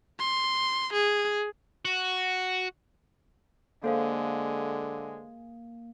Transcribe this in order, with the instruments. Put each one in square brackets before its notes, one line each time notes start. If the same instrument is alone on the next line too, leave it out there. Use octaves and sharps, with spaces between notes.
[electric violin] C6
G#4
[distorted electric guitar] F#4
[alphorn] D3 [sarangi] G#3 [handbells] A#3 [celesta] A4 C5 F5